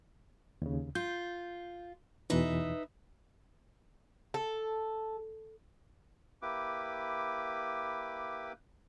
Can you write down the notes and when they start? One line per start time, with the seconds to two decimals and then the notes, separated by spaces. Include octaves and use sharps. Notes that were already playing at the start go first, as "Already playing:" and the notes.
0.62 D#2 C#3
0.95 F4 G6
2.30 E2 B2 E3 D#4 B4 E5
4.34 A4
6.42 A#3 E4 G4 B4 D6